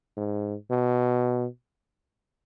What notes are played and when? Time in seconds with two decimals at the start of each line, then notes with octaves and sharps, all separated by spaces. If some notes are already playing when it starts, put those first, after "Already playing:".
0.17 G#2
0.71 B2